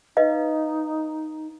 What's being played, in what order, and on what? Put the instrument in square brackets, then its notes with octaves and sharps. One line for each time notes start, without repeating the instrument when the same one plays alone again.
[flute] D#4 [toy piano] B4 D#5 F5